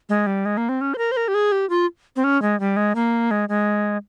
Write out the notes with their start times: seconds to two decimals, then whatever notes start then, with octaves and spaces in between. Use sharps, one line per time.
0.09 G#3
0.27 G3
0.45 G#3
0.57 A#3
0.69 C4
0.81 C#4
0.94 C5
0.98 A#4
1.12 C5
1.17 A#4
1.28 G4
1.34 G#4
1.52 G4
1.70 F4
2.16 C4
2.24 C#4
2.42 G#3
2.60 G3
2.77 G#3
2.95 A#3
3.31 G#3
3.49 G#3